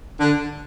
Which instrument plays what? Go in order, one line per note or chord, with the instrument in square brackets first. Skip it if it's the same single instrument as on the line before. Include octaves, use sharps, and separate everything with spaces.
[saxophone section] D3